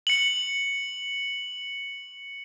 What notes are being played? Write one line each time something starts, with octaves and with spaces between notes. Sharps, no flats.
C#7 F#7